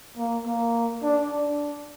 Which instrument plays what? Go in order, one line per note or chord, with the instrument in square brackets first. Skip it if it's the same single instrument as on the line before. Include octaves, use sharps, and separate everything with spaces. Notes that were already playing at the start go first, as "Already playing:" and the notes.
[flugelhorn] A#3
A#3
D4
D4